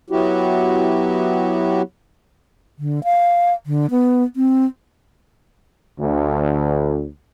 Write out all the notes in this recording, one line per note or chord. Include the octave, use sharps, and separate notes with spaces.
F#3 B3 E4 F#4 G4
D3
F5
D3
B3
C4
D2